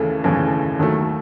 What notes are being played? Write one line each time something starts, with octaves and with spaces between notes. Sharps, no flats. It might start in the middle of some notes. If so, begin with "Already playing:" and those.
Already playing: D#2 C#3 E3 A3 A4
D#2 C#3 E3 A3
D#2 D#3 F#3 A3